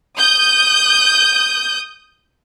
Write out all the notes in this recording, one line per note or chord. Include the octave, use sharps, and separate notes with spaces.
D#6 G6